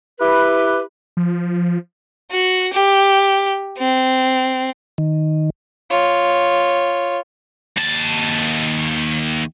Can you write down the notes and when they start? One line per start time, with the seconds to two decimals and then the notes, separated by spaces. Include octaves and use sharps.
0.20 E4 G4 B4
1.17 F3
2.31 F#4
2.73 G4
3.79 C4
4.98 D#3
5.90 F4 C#5
7.77 D#2 A5